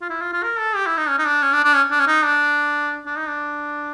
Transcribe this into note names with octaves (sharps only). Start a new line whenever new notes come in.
F4
E4
F4
F4
A#4
A4
G4
E4
D#4
C#4
D#4
D4
C#4
D4
D4
C#4
D4
C#4
D#4
D4
D4
D#4
D4